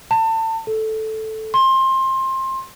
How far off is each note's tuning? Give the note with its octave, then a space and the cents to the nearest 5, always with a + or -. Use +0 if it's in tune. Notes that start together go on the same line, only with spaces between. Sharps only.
A5 +30
A4 -5
C6 +20